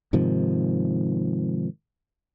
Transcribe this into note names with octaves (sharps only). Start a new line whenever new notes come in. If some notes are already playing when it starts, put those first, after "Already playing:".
G#2 C3 D#3 F3